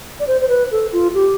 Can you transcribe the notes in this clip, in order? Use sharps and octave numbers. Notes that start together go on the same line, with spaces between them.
D5
C5
C5
B4
A4
F4
G4